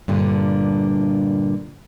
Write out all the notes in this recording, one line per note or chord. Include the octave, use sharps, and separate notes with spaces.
G2 A#2 D3